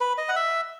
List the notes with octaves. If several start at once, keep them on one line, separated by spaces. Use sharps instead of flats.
B4
D#5
F#5
E5